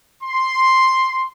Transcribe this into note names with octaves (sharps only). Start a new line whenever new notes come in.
C6